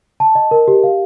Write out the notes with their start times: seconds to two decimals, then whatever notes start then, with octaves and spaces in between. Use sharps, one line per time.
0.20 A5
0.35 D#5
0.51 A#4
0.68 G4
0.83 F5